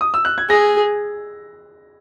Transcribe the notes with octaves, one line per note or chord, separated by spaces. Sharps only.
D#6
E6
F#6
G#6
G#4 A#6